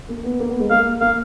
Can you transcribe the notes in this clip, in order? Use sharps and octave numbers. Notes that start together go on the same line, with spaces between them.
A#3
B3
A#3
B3
G#3
A#3 F5
A#3 F5